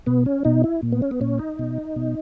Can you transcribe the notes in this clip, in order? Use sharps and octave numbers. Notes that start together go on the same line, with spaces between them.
B2 B3
C#4
B2 D#4
E4
A#2
B3
C#4
B3
A#2 C#4
D#4
B2
B2